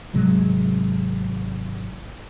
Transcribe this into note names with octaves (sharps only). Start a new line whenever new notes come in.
G#1 C3 F#3 G#3